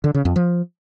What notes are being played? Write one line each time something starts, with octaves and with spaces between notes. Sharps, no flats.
D3
C#3
F2
F3